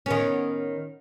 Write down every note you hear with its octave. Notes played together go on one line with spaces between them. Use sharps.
D#3 B3 C#4